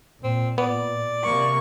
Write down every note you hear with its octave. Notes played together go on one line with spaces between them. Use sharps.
A#2 C4
B3 D5
C3 A#3 C#6